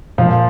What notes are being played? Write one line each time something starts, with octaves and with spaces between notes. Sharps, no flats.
A#2 F3 F5